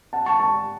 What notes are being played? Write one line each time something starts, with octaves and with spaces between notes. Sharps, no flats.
F#5 A5
A5 C#6
A5 C#6